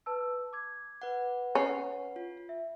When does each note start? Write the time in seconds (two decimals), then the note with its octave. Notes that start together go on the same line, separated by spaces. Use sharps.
0.06 B4 A5 E6
0.53 D6 G#6
1.02 B4 F#5
1.55 C#4 C#5 C7
2.16 F4
2.49 E5